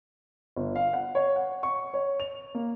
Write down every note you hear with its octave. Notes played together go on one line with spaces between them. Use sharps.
G1
F5
F#5
C#5
F#5
C#6
C#5
F7
A#3